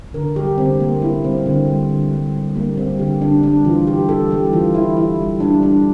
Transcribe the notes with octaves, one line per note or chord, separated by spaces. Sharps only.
D3 A#4
G3 G4
D3 C4
A#3
A#3 E4
G3 C4
D3 C4
G3
D3
G3
G3
G3 A#3
G3 C4
D3 G4
D3 D4
G3 D4
E3 F4
G3 G4
E3 A4
G3 G4
E3 F4
E3 E4
E3 E4
G3
G3 D4
G3 D4